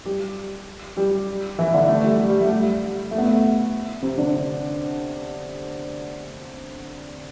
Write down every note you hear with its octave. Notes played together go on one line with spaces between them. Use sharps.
G3 G4
G3 G4
E3 E4
D3 D4
A3
G3
G3
G3
A3
G3
A3
B3
A3
C3 C4
D3 D4